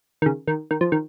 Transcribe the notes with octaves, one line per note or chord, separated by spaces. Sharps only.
D#3
C#3
D#3
D#3
F3
D#3